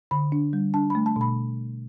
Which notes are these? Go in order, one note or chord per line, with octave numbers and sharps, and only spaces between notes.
D3 B5
D4
G3
D4 A5
A3 B5
A5
B2 B5